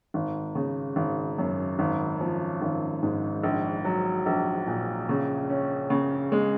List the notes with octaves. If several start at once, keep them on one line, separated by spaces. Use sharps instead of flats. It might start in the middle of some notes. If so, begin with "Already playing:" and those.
G#1
C#3
G#1
F#2
G#1
F3
G#1
G#2
A#1
F#3
A#1
A#2
C#3
C#4
C#3
G#3